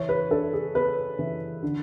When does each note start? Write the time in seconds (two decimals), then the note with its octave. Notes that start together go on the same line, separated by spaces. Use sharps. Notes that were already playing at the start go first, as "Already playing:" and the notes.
Already playing: E3 C#5
0.09 B4
0.31 D4 A4
0.53 G#4
0.75 B3 B4
1.19 E3
1.63 D3